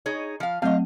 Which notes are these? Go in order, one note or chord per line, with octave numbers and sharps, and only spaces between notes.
D#4 G#4 C#5
F3 F5
F#3 A3 C4 D#5 F5